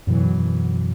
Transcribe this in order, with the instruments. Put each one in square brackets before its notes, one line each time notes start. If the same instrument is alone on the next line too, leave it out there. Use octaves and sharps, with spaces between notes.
[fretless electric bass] F#2 B2 E3 F#3